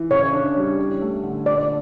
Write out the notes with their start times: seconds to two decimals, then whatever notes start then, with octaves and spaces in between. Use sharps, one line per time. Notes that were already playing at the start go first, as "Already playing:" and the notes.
Already playing: E3
0.11 C#3 C#5
0.33 D4
0.56 G3
0.78 C#4
1.01 A3
1.23 D3
1.46 A#2 D5